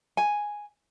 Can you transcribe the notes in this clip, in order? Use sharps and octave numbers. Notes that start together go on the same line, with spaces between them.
G#5